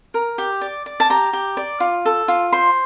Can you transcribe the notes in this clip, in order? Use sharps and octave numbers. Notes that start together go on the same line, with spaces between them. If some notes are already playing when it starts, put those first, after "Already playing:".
A#4
G4
D5
D5
A5
G4 A#5
G4
D5
F4
A4
F4
C5 C6